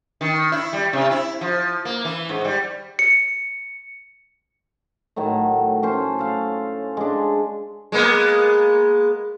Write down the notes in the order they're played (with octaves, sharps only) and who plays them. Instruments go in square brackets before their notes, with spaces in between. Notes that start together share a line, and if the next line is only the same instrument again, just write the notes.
[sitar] D#3
E4
G3
C3
E4
F3
A#3
E3
G#2
G3
[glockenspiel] C#7
[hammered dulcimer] A2 D#3 F#3 A3
A3 C#4 C5
A4 F5
G#3 D4
[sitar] G#3 A#3 B3